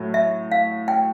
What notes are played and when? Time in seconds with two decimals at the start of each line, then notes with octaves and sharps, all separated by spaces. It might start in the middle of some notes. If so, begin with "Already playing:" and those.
Already playing: A2 F#3 A3
0.14 E5
0.52 F5
0.88 G5